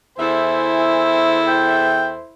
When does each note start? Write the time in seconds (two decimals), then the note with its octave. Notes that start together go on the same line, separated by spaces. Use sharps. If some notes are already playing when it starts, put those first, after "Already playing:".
0.19 E2 E4 A4 C5 E5 G#5
1.48 C5 G5